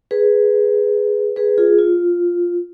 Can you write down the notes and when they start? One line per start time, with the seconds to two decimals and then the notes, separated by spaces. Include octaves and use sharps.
0.11 G#4 B4
1.36 G#4 B4
1.58 F4 G#4
1.79 F4